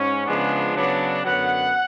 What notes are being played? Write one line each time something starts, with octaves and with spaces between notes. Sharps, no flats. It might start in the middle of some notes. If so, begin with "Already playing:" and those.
Already playing: G#2 C#4
C#3 F3 G#3 B3 D4
C#3 F#3 B3 D4
F#2 D3 F#3 B3 F#5